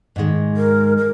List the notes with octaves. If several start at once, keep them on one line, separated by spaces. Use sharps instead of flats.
G#2 D#3 G#3
A#4
A#4